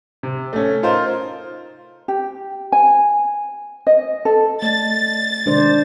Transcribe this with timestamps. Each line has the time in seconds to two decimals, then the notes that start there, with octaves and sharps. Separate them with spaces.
0.23 C3
0.53 A3 C#4
0.83 D#4 F4 A#4 C5
2.08 G4
2.72 G#5
3.87 D#5
4.25 A4
4.62 A3 D5 D#5 A6
5.46 C3 D#3 G#3 D4 C5 D5